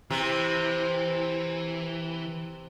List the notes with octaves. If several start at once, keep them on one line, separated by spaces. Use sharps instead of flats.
C3 E3